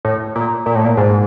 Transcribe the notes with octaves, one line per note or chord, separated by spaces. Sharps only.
A2
A#2
A#2
A2
A#2
G#2